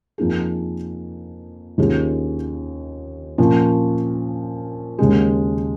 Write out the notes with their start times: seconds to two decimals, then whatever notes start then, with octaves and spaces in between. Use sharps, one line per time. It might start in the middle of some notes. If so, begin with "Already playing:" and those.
0.18 F2 F3 A#3 D#4 G#4
1.78 D#2 D#3 C#4 F4 G#4
3.38 A#2 F3 C#4
4.99 D#2 C#3 G#3